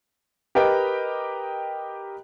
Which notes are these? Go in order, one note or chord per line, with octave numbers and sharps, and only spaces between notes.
G4 A#4 B4 D#5 G5